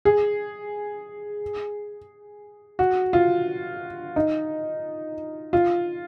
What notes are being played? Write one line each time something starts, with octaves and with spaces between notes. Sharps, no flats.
G#4
F#4
F4
D#4
F4